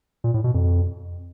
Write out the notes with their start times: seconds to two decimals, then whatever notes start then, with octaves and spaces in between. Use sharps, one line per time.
0.24 A#2
0.34 A2
0.44 B2
0.54 F2